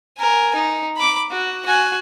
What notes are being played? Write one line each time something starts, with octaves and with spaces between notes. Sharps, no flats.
A#4 G#5
D#4
B5 D6
F#4
F#4 G#5